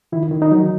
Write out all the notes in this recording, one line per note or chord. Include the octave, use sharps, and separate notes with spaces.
D#3 E4
D#3
D#4
F#3